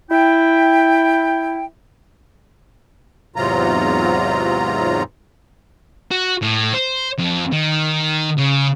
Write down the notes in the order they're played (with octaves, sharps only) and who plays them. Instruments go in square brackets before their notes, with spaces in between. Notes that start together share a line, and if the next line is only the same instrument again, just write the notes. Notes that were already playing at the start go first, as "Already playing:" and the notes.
[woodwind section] E4 G5
[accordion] E2 G#2 C3 F#3 F4 A#5
[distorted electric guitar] F#4
A2
C5
F2
D#3
C#3